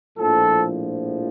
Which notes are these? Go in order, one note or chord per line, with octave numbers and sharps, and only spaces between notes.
A#1 A2 F3 A4